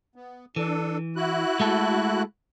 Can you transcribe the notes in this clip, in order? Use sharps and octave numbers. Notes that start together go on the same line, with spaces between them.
B3
E3 D4 A4
E4 F#4 F#6
G#3 A3 A4